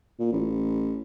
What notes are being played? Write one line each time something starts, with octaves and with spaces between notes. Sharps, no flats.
A#2
A1